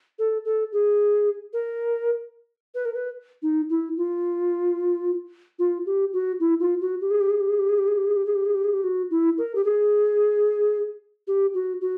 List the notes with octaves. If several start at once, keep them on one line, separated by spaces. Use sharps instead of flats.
A4
A4
G#4
A#4
B4
A#4
B4
D#4
E4
F4
F4
G4
F#4
E4
F4
F#4
G4
G#4
G4
G#4
G4
G#4
G4
G#4
G4
G#4
G4
G#4
G4
G#4
G4
G#4
G4
G#4
G4
F#4
E4
A#4
G4
G#4
G4
F#4
F#4